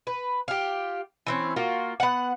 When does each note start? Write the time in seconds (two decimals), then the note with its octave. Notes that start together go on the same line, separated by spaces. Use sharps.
0.07 B4
0.48 F4 G4
1.27 E3 C4 C#4
1.56 A#3 F4 F#4
2.00 B3 F#5